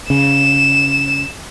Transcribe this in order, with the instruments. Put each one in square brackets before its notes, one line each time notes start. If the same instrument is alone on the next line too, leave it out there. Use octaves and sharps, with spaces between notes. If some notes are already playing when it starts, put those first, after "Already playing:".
[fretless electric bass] C#3 [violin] E7